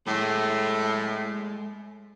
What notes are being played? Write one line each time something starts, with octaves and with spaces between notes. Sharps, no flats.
A2 G#3 G#4 A4